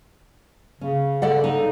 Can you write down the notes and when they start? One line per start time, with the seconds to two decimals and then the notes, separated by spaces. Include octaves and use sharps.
0.81 C#3 C#4
1.22 A4 D5 F#5
1.44 D#4